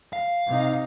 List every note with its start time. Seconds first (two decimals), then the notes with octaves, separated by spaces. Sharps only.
0.13 F5
0.47 C3 D#4